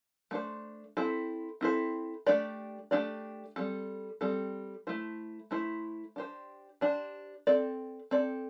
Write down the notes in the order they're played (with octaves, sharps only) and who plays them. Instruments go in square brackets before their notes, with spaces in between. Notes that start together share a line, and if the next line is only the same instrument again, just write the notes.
[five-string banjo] A3 D4 C5
C4 E4 A4 C5
C4 E4 A4 C5
A3 D4 G4 D5
A3 D4 G4 D5
G3 C4 A4
G3 C4 A4
A3 E4 C5
A3 E4 C5
D4 G4 C5
D4 G4 C5
C4 A4 D5
C4 A4 D5